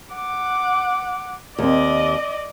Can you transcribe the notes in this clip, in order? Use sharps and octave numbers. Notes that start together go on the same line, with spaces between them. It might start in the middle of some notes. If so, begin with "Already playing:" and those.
F#5 D6
D#2 C4 D5 D#5